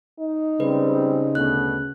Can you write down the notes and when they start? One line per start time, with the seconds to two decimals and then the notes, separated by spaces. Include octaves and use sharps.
0.20 D#4
0.60 C#3 G3 G#3 C4 B4
1.35 D2 B2 F#6